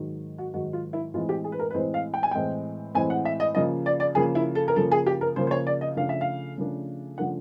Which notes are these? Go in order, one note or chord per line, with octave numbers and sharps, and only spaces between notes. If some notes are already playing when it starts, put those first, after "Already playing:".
Already playing: G#2 D#3 F#3
F#4
G#2 D#3 F#3 F#4
F4
E4
A2 E3 G#3 C4 F4
G4
G#4
B4
A#4
B4
A2 E3 G#3 C4 C5
F5
G5
G#5
A2 E3 G#3 C4 G5
A2 E3 G#3 C4 G#5
F#5
E5
D#5
C#3 F3 A#3 D#5
D5
D5
C#3 F3 A#3 G#4
E4
A4
A#4
C#3 F3 A#3 A4
G#4
G4
A#4
C#3 F3 A#3 C5
C5
C#5
D5
D#5
C#3 F3 A3 D4 F5
E5
F5
C#3 F3 A3 D4
C#3 F3 A3 D4 F#5